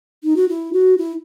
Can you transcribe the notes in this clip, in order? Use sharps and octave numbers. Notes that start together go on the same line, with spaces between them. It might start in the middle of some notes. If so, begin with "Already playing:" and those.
D#4
F#4
E4
F#4
E4